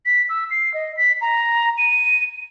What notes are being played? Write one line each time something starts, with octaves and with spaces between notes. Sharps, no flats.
B6
E6
C7
D#5
B6
A#5
D#7